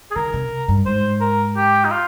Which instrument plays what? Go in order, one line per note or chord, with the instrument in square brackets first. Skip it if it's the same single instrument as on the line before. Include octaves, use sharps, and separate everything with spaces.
[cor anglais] G#4
[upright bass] D3 [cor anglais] A#4
[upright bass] C3
G2
[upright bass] G#2 [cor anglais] C5
[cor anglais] A#4
G4
D#4
F4